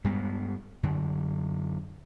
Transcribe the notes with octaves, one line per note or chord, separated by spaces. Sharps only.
G2 G3 G#3 B3
F#2 D3